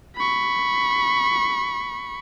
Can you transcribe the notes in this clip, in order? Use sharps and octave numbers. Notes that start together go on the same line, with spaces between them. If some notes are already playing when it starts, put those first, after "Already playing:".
B5 C#6